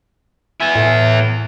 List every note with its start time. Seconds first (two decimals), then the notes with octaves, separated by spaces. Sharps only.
0.60 B3 E4 G#5
0.75 A2